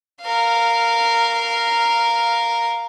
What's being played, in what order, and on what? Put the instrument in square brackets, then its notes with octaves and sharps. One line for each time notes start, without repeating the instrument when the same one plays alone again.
[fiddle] A#4 F5